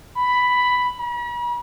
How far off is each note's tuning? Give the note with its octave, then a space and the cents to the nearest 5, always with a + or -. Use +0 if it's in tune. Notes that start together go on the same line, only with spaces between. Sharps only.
B5 +5
B5 -45